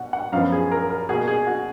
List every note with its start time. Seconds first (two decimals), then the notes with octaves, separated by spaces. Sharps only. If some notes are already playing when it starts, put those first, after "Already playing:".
Already playing: B2 F#5
0.13 F#5
0.32 F#2 F3 B3 F5
0.52 G#4
0.72 A#4
0.90 A#4
1.09 B2 A#3 G#4
1.28 G#4
1.47 F#4